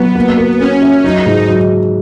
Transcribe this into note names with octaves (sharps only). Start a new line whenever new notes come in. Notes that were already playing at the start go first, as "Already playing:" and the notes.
Already playing: F#3 B3 F#4
A#3
A#4
C#4 A#4
E5
F#3 D#4
G#2
F#3